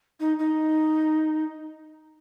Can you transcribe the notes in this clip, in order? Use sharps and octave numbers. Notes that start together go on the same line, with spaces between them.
D#4
D#4